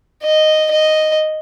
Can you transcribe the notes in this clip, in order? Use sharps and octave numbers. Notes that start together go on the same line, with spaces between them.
D#5
D#5